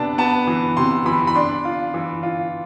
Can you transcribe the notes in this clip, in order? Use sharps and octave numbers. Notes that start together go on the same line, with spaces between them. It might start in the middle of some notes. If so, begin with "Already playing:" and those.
Already playing: C3 B3 D4 A5
B3 A5
E3
C3 C6
E3 B5
B5
D4 C6
F4
E3
F4